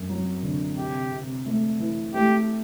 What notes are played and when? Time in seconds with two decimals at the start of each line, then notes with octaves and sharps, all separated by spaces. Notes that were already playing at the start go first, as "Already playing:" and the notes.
Already playing: F#2
0.09 F#3
0.43 D3
0.77 C3 G4
1.12 C3
1.46 A3
1.80 E3
2.14 A3 G4